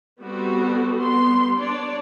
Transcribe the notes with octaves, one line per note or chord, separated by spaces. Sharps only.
G3 B3 C4 F#4 A4
G3 B3 C6
D4 C#5 D5